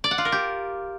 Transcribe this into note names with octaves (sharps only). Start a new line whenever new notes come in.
D5
F#5
F4
A#4
G4